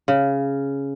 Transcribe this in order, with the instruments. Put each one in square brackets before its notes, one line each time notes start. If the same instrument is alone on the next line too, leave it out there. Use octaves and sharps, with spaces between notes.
[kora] C#3